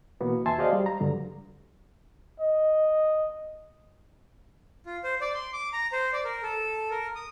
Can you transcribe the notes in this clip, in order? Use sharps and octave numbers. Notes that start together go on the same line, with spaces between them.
B2 E3 A#3 B3 F#4
D#2 E5 G#5 A5 C6
F#4 G#4 C5 D5 D#5 F5
G3
A#5
G2 D3 F#3
D#5
F4
C5
D5
C6
D6
A#5
C5
D5
A#4
A4
A#4
D#6